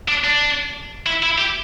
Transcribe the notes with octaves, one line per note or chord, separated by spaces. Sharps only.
D4
D4
E4
E4
G4